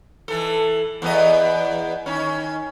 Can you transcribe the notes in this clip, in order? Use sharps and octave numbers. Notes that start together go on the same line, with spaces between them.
E3 A4
E2 B3 D#5
D#3 C#4